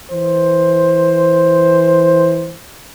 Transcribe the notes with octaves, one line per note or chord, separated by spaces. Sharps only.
E3 C5